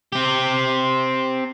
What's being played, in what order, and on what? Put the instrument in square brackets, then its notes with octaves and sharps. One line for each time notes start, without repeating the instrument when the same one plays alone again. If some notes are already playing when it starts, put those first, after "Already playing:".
[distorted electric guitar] C4 G4